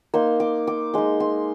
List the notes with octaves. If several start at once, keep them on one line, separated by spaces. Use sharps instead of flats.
A#3 D#4 C6
D6
D6
G#3 D#4 C6
C6